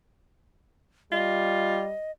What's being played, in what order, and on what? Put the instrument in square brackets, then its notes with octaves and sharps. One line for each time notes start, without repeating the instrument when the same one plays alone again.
[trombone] G3 [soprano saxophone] F4 [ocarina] D#5